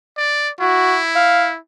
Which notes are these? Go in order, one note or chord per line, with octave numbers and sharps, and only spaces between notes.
D5
E4 F#4
F5